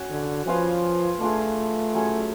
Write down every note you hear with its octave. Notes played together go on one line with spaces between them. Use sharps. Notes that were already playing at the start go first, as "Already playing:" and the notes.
Already playing: C#4 F#4 C#5
D3
F3 C#4 F4 B4 F5
A3 D4 F4 G#4
F#3 C#4 G#4 C#5